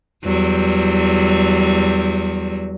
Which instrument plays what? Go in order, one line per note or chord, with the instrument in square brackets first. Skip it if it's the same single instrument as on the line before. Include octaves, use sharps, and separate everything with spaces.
[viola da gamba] E2 F#3 G3